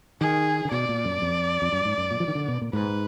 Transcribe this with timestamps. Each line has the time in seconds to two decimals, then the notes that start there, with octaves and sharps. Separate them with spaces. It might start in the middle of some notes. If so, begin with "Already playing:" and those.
0.21 D#3 G#4
0.65 D3
0.71 B2 D5
0.89 A#2
1.05 F#2
1.22 F2
1.62 F2
1.73 F#2
1.85 G#2
1.98 F#2
2.11 A#2
2.20 F3
2.28 D#3
2.35 D3
2.48 B2
2.61 A#2
2.73 G#2 B4